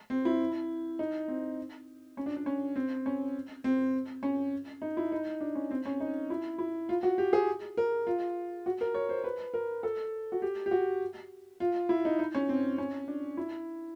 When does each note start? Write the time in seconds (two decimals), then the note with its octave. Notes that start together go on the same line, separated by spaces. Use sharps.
0.10 C4
0.25 E4
0.99 D#4
1.28 C4
2.17 C#4
2.26 D4
2.36 D4
2.46 C#4
2.76 C4
3.06 C#4
3.64 C4
4.23 C#4
4.82 D#4
4.97 E4
5.12 D#4
5.41 D4
5.55 C#4
5.71 C4
5.85 C#4
6.00 D#4
6.30 E4
6.59 E4
6.89 F4
7.03 F#4
7.18 G4
7.33 G#4
7.77 A#4
8.07 F4
8.66 F#4
8.81 A#4
8.94 C#5
9.09 C5
9.24 B4
9.54 A#4
9.83 A4
10.32 F#4
10.42 G4
10.66 G4
10.71 F#4
11.60 F4
11.89 E4
12.05 D#4
12.19 D#4
12.35 C#4
12.49 C4
12.78 C#4
13.08 D4
13.37 E4